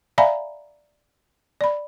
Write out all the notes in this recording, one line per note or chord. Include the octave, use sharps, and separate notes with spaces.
D5 E5 F5 G#5 A#5 B5
D5 B5